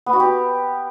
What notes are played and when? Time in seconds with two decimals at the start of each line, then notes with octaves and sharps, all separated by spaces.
0.06 B3
0.13 F#4
0.20 G4